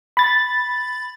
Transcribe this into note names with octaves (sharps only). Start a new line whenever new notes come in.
B5 A6